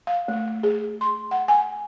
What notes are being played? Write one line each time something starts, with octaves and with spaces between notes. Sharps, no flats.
F5
A3
G#4
C6
F#5
G#5